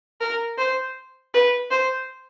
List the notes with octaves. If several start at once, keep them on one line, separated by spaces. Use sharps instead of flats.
A#4
C5
B4
C5